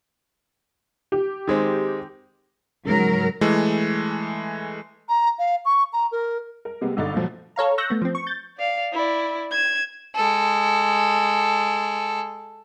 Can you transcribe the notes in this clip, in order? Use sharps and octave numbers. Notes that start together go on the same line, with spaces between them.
G4
D#3 G#3 C4
G#2 C#3 F#3 A#4
E3 G#3 A3
A#5
F5
C#6
A#5
A#4
A#4
C3 G3 G#3 A#3 B3
G1 D3 D#4 A6
A#2 D3 F3 F#3
A4 C#5 F5 A#5
C#6 E6 F#6 G6 A#6
A3 B3
F3 C4
C#6
G6 A6
D5 F5
E4 D5
G#6 E7
G#3 A4